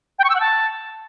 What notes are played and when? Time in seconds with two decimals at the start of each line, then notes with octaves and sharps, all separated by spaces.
0.19 G5
0.24 C#6
0.30 E6
0.35 F#5
0.40 A5